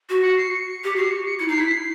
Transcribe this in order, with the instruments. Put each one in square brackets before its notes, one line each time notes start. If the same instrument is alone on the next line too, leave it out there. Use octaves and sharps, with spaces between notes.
[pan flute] F#4
[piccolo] C#7
C7
C#7
[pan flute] G4
[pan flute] F#4 [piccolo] C7
[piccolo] C#7
C#7
[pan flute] E4 [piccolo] C#7
[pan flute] D#4 [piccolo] C7
[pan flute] E4
[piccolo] B6
C7